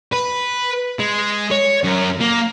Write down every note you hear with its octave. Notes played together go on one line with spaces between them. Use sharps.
B4
G#3
C#5
F#2
A#3